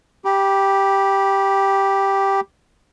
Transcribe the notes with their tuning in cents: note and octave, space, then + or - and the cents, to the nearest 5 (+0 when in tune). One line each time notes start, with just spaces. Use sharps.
G4 +0 B5 -30